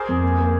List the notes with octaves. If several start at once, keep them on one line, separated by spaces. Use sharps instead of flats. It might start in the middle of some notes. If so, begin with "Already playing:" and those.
Already playing: G#4 A#4 C5 D5
F2
A#3
A#3